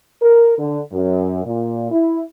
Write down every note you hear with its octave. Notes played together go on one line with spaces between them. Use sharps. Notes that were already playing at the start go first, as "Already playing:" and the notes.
A#4
D3
F#2
A#2
E4